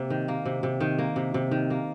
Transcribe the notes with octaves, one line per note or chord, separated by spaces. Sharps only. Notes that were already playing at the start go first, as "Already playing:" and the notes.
Already playing: C3 A#3
D#3
A#3
C3
C3
D#3
A#3
C3
C3
D#3
A#3